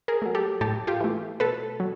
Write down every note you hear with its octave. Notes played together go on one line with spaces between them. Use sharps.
G#4 A#4
F#3 A3
G4 A4
A2 G4 A4
F4 G4
E3 A3
B2 A4 B4
F#3